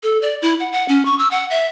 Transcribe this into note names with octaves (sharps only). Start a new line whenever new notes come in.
A4
D5
E4
F#5
F#5
C#4
C#6
E6
F#5
E5